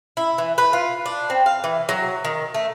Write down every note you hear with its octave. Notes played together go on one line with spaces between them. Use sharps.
E4
E3
B4
F4
D4
C4
F5
E3
F#3
D#3
A3